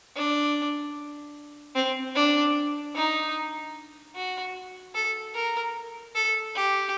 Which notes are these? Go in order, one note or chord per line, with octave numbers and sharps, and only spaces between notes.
D4
C4
D4
D#4
F#4
A4
A#4
A4
G4